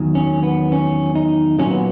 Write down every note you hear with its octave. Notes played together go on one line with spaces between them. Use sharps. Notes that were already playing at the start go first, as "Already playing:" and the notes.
Already playing: E2 D#3 F#3
C#4
B3
C#4
D#4
A#2 F#3 A#3 C#4
B3